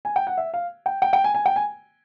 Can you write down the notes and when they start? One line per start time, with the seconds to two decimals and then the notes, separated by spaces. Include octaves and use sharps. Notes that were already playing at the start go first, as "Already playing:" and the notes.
0.05 G#5
0.16 G5
0.27 F#5
0.37 E5
0.54 F5
0.86 G5
1.02 G5
1.13 G5
1.24 G#5
1.35 G#5
1.46 G5
1.56 G#5